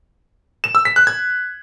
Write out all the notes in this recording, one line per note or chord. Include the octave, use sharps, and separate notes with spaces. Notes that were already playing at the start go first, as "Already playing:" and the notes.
E7
E6
B6
F#6
G#6